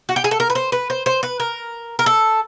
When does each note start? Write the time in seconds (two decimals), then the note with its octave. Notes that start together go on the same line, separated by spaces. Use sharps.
0.09 F#4
0.16 G4
0.24 G#4
0.31 A4
0.40 A#4
0.50 B4
0.55 C5
0.72 B4
0.90 C5
1.06 C5
1.23 B4
1.40 A#4
1.99 A#4
2.06 A4